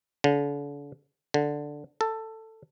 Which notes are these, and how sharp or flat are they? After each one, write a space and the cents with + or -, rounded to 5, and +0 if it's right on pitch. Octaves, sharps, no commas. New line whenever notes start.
D3 -40
D3 +0
A4 +10